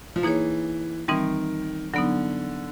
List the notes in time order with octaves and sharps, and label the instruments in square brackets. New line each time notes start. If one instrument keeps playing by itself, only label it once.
[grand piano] F3
[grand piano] E3 [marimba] A#3 D#4 G#4 C#5
[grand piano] D#3 [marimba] E3 G3 C4 D#4
[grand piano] D3 [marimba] F#3 B3 D#4